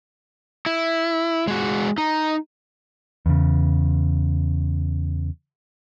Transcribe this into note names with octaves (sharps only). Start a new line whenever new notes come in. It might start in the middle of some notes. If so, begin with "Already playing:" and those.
E4
G#3 F#4
D#4
E2 C#3